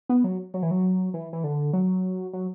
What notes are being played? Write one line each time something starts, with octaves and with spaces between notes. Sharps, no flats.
B3
F#3
F#3
E3
F#3
E3
E3
D3
F#3
F#3